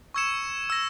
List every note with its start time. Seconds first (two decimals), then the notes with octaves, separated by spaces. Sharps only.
0.14 C#6 E6 G#6 C#7 E7
0.70 E6 A#6